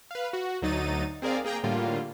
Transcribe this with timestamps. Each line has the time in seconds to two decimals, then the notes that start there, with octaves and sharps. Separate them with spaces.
0.11 B4 F5
0.33 F#4
0.62 D2 F#3 D#4 A6 D#7
1.22 C4 G#4 A#4 D5 F5
1.44 A#3 G#4 G5 A#5
1.64 A2 D3 G3 A#3 F4